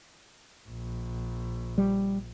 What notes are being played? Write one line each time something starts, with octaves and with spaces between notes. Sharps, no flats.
A#1
G3